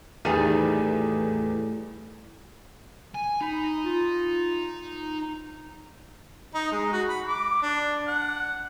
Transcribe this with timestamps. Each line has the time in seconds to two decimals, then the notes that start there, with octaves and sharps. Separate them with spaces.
0.25 E2 A2 D#3 G3 G#4 D#7
3.14 G#5
3.41 D#4 B5
3.84 F4
6.54 D#4
6.72 G#3
6.92 F#4
7.09 B5
7.28 D6
7.62 D4
8.07 F#5